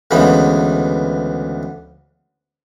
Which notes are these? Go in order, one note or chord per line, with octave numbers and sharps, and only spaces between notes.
D2 C#3 E3 G#3 B3 B5